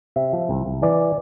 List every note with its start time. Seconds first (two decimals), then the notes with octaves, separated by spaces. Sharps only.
0.16 C3 E5
0.33 F3
0.49 C2
0.66 C2
0.82 E3 D5